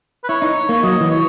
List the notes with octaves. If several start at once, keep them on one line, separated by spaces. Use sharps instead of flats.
B4
E4 C#5
D#4
A#3 C#5
F#3 D#5
E3
C#5